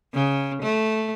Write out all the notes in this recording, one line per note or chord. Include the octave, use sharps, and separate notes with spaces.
C#3
A3